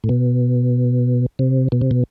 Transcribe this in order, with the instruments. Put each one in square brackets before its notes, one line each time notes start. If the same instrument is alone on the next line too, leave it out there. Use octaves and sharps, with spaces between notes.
[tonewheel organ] A2
B2
C3
B2
C3
B2